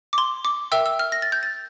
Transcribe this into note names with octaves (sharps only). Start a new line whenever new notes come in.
D6
C6
D6
A#4 E5 G5 E6
E6
F6
A#6
A6
G6
A6